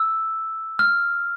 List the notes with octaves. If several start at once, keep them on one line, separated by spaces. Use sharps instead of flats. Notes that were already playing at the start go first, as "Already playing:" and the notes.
Already playing: E6
F6